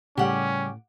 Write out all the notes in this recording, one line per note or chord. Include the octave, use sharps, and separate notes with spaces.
A2 C#3 G3 C#4 G4 F#5